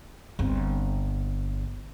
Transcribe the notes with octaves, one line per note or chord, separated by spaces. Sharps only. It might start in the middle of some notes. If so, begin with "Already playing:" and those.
G1 C4